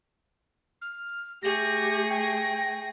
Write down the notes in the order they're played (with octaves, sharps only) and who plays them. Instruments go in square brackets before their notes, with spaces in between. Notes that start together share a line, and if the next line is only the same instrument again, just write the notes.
[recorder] F6
[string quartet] A3 G#4 C#6 [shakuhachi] G4 [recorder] A#6
[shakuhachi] G5